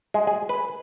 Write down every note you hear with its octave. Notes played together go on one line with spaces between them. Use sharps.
G#3
G#4
B4